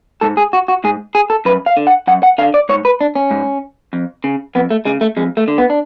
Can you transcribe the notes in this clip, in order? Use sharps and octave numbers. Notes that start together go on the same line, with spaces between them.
G#2 A4
G#4
F#4
F#4
G#2 G#4
G#4
A4
F#2 B4
F5
D3
F#5
F#2 F#5
F#5
D3 F5
D5
G#2 C#5
B4
D4
C#4
G#2
F2
C#3
F2 B3
A3
C#3 G#3
A3
F2 G#3
A3
D3
B3
D4